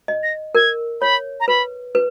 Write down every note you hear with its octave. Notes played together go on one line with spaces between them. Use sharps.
D#5
A#6
A#4 G#6
C#5 B5
A#5
B4 B5
B4